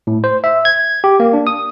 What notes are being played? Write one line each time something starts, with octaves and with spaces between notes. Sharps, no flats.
A2
C5
E5
G#6
G4
A#3
D4
D#6